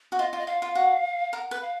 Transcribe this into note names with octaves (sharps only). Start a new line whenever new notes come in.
F#4
F4 D#5
F4
D#5
F4 F5
F4
F#4
A#4 F#5
B4
F5